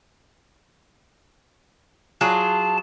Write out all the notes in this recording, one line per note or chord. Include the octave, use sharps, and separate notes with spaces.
F#3 F4 G#4 A5